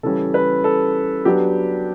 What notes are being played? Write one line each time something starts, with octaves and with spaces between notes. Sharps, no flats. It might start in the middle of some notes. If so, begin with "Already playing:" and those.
C#3 E3 G3 C#4 A4
B4
A4
F#3 B3 D4 G4